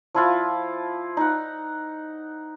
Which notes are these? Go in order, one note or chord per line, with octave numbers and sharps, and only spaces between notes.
F3 E4 F4
D#4 F#5